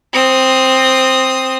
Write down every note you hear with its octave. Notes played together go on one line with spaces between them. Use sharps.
C4 D#6